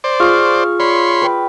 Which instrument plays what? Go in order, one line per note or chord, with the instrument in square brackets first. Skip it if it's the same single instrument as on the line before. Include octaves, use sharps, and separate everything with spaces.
[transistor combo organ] C5 D5
[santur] F4 F5 [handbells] G#4 C#6 F6
[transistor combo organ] C#5 B5 C6 [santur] D5
[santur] B4 G5